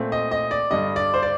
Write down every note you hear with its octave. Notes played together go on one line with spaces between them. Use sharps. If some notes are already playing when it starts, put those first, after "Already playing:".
Already playing: A#2 A3 C4
D#5
D#5
D5
G2 D3 G3 D#5
D5
C5
D5